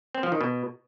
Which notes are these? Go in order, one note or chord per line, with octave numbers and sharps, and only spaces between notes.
C4
F3
D#3
B2